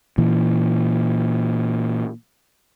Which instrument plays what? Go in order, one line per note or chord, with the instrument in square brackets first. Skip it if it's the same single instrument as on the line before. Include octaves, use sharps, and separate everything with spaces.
[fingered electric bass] A#2 E3